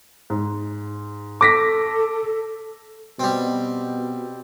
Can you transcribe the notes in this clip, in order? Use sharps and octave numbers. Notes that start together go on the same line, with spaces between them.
G#2
A4 D6 A#6 B6
B2 G3 C4